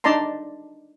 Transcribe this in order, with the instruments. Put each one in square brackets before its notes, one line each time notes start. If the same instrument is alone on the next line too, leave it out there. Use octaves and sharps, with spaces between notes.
[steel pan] D4 D#4 D5 A5 A#5 C6